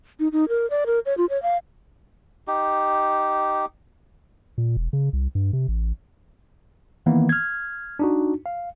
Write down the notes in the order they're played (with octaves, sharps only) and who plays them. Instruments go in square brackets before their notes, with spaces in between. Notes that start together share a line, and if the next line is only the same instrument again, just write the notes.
[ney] D#4
D#4
A#4
D5
A#4
C#5
F4
C#5
F5
[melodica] D#4 G4
[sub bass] A#2
E1
C#3
C2
G2
C3
A1
[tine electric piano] D#3 E3 A#3 B3
F6 G#6
D4 D#4 F#4
F5